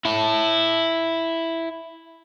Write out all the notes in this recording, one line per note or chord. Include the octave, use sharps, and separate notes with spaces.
E4 A5